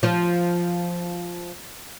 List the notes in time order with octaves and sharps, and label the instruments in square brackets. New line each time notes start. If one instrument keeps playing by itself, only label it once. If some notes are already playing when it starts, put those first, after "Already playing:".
[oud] F3 F4